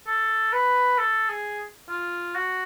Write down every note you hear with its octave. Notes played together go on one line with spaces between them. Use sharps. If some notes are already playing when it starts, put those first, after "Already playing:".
A4
B4
A4
G#4
F4
F#4